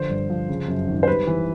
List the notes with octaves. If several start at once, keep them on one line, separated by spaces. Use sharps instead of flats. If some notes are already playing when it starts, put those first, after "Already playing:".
Already playing: D3 F3 C5
G2
F3
C#3
F#2
G#1
C5
G3 B4
E3